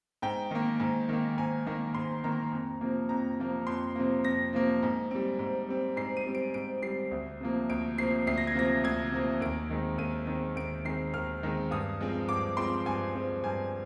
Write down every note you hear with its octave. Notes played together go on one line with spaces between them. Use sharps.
G#2 G5
D#3 A#3
G#2
D#3 A#3
G#2 G#5
D#3 A#3
G#2 C6
D#3 A#3 A#5
F2
C3 F3 A#3
F2 A#5
C3 F3 A#3
F2 C6
C3 F3 A#3
F2 A#6
C3 F3 A#3
G#2
G3 C4
G#2
G3 C4
G#2 C7
D#7
G3 C4
D7
G#2 D7
G3 C4 C7
D2
C3 F3 A#3
D2 D7
C3 F3 A#3 C7
D2 C7
A#6
G#6
C3 F3 A#3 A#6
D2 G#6
C3 F3 A#3
D#2 D7
D#3 G#3 C4
D#2 D#7
D#3 G#3 C4
D#2 D7
D#3 G#3 C4 C7
D#2 F6
D#3 G#3 C4
G2 D#6
F3 G#3 C4
G2 D6
F3 G#3 C4 C6
G2 G#5
F3 G#3 C4
G2 G#5